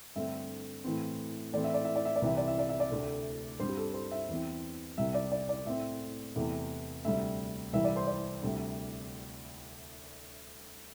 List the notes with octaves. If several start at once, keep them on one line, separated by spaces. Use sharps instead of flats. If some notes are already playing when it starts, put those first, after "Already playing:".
G2 D3 A3 C4 E5
A2 E3 C4
A2 E3 A3 C4 D5
E5
D5
E5
D5
E5
D5
C2 C3 E3 C4 E5
D5
E5
D5
E5
D5
D2 C3 A3
G2 G3 C4 C5
G4
A4
C5
E5
E2 E3 C4
C2 C3 G3 E5
D5
D5
D5
A2 A3 C4 E5
E2 C3 A3
D2 C3 G3 E5
C2 C3 E3 G3 E5
D5
C5
D5
D2 C3 G3